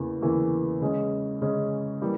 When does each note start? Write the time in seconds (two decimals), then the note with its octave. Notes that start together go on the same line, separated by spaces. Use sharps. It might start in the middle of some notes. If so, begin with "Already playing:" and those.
Already playing: E2 C#3 E3 A#3
0.21 E2 C#3 E3 A#3
0.81 C#3 G#3 C#4
1.42 C#3 G#3 C#4
2.02 E3 G3 A#3